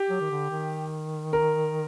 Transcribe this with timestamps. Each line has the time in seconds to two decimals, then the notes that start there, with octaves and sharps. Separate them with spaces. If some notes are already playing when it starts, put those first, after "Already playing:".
Already playing: G4
0.10 F#3
0.20 D#3
0.30 D3
0.50 D#3
1.33 A#4